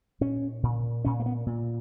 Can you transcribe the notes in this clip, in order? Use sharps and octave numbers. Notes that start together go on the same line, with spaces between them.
A#2 C#4
A#2
A#2 C#4
A#3
B3
A#2